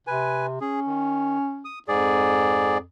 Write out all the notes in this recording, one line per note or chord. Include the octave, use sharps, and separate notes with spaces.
C3 B4 G#5
C#4 G#4
D#3
D#6
F2 G#2 G#4 D5